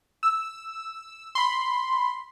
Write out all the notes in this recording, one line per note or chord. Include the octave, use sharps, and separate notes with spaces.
E6
B5 C6